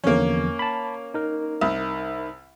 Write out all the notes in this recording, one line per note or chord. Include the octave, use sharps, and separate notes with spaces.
E2 D3 F3 A#3 C#4
A5 B5
D#4 A#4
C2